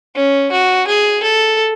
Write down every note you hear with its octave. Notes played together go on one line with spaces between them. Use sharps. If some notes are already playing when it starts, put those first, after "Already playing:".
C#4
F#4
G#4
A4